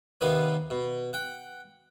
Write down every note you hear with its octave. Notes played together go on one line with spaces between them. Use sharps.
D#2 C3 D#3 B3 B4
B2
F#5 G5